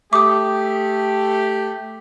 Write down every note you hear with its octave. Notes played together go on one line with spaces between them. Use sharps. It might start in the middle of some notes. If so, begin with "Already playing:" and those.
A3 G4 D6 D#6